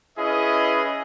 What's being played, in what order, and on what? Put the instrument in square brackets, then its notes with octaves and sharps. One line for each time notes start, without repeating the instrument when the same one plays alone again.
[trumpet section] C#4 E4 G#4 B4 D#5